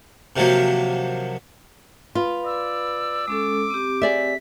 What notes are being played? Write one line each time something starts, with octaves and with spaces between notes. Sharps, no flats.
C3 D#3 F3 F#3 A#3
F4 B4 B5
D5 E6
G#3 C#4 A4 D6
C4 G4
G#4 D5 E5 B6